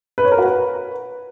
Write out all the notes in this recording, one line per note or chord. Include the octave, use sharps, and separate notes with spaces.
B4
C#5
A#4
F#4
B4